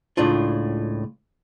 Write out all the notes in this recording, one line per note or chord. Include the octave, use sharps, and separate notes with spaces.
C#2 A2 D4 F4